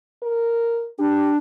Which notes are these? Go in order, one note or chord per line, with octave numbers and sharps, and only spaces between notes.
A#4
D4 G4